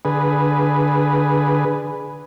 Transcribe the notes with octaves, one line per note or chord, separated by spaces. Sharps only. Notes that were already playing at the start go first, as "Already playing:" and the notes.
D3 G#4 B4